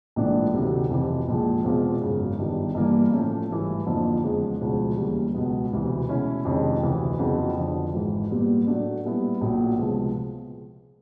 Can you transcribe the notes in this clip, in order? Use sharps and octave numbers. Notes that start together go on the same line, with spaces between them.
A#1 G#2 E3 A3 D4
D2 C3 D#3 F#3 A3
F2 C3 E3
A#1 A#2 F3 G#3
E2 B2 G#3 C4 F4
G#1 F#2 C#3
G1 G2 D#3
G2 E3 G3 A#3
A2 F3 A3 C#4
G#1 G#2 E3 G3
F2 D3 F3 A#3 D#4
E2 C#3 F3 G#3
E1 D2 C#3 F3 G#3
D#2 C#3 E3 G3
C#2 B2 F#3 B3
E1 D2 C3 E3
B2 G#3 C#4 E4
F2 C3 D#3 G#3 C#4
D2 C3 E3
F2 C#3 F#3 B3 E4
F2 D3 F3
G#1 G#2 E3
A#2 G3 B3
A2 F#3 A3 D4
A#2 G3 B3 E4
A#1 A#2 F#3 A3
C#2 C3 F3 G#3 B3